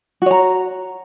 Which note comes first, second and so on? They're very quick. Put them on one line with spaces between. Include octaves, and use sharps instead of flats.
F#4 C#5 A#5